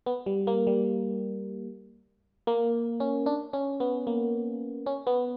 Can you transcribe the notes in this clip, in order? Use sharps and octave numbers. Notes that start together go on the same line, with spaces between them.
B3
G3
A#3
G3
A#3
C#4
D4
C#4
B3
A#3
C#4
B3